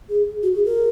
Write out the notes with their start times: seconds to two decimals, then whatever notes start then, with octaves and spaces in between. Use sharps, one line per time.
0.09 G#4
0.43 F#4
0.55 G#4
0.65 A#4